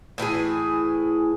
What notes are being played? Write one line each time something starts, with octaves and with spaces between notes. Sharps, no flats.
A2 E3 E4 G#4